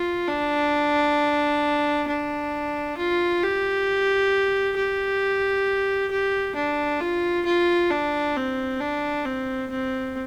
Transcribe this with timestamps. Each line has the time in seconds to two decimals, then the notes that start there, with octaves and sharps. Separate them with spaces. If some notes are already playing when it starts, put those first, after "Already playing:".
Already playing: F4
0.28 D4
2.08 D4
2.97 F4
3.42 G4
4.76 G4
6.11 G4
6.55 D4
7.00 F4
7.45 F4
7.90 D4
8.36 C4
8.80 D4
9.25 C4
9.70 C4